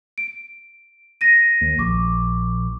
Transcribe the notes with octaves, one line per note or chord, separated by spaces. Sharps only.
D7
A#6 D#7
D#2
A#1 C#6 D6